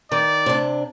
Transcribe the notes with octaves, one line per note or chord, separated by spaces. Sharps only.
D#3 D5
C3 D4